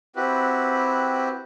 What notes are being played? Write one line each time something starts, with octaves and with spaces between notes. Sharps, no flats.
C4 E4 F#4 G4 B4